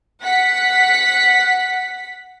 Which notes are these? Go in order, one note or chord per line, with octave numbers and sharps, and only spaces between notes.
F#5 B6